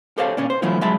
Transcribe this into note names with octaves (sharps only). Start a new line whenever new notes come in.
G4 A4 C5 C#5 F5 A5
A#2 C#4 D4
C5
E3 F#3 A3 E4 F4
F#3 G#3 E5 A5 B5